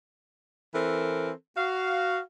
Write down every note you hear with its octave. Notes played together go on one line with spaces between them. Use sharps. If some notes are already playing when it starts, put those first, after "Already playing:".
E3 C4 A4 A#4
F#4 F5